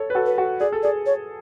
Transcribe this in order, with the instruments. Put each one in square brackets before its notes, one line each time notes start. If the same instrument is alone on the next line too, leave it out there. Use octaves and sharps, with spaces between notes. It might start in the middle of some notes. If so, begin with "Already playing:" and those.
Already playing: [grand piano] A4 C#5
B4
F#4 A4
[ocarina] B4
[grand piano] F#4 A4
[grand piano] G#4 [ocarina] D5
[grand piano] A4
[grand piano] G#4 [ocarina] D5
[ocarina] C#5